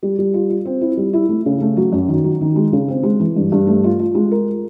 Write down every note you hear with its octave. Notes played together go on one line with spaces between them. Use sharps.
G3
G3
F4
F4
C4
E4
G3
E4
A3
C#3
A3
F#3
F#2
D#3
F#3
D#3
G#3
C#3
C4
G#3
E3
G2
G2
A3
F4
F4
G#3
A#4